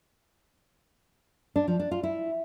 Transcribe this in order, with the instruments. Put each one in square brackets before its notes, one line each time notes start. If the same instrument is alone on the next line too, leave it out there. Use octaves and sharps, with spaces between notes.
[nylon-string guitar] D4
F3
D4
F4
E4